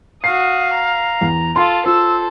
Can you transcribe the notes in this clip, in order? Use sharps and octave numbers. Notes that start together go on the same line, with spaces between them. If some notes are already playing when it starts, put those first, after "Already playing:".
F#4 F5 D#6 C7
A#5
E2
F4 A4 C6
F4 A4 C5 E6